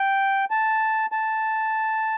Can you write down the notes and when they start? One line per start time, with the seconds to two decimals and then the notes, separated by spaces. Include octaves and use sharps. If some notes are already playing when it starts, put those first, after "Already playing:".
Already playing: G5
0.51 A5
1.12 A5